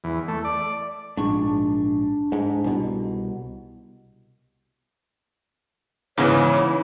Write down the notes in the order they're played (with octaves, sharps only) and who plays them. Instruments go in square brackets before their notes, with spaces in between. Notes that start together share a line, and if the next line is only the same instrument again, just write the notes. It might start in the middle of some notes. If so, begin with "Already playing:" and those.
[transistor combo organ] E2
A3
D5
[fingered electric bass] A#1 G#2 [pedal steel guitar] D4 C#6
[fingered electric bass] G#2
C2 B2
[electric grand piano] G#2 B3 [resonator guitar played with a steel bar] C#3 E3 [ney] C#5